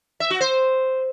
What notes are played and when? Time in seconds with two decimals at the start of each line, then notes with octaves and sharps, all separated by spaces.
0.20 E5
0.30 F#4
0.41 C5